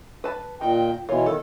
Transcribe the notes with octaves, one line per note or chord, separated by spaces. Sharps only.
B4 A5
A#2 D#3 G5
B2 E3 F4 C#5
D#3 A4